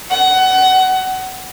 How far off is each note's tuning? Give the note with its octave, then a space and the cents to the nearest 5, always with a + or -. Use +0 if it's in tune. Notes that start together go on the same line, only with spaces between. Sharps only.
F#5 +25